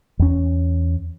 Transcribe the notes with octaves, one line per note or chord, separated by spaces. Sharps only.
E2 C#4